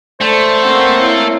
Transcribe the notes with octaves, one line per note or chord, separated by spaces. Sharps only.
A3 A4 C5 D5
A#3 C4 F#5
E4 C#5